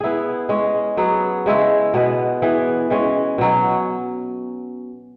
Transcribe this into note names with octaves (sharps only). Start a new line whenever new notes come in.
B3 E4 G#4
G#3 C#4 G#4
F#3 B3 G#4
C#3 G#3 E4 C#5
B2 B3 G#4 B4
E3 B3 G#4
E3 G#3 C#4
B2 F#3 C#4